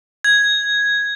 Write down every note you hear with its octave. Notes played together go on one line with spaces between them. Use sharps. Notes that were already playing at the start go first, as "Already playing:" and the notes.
G#6